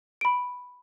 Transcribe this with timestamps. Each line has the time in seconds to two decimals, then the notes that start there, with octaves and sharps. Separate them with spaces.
0.21 B5 D7